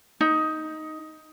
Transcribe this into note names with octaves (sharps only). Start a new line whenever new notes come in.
D#4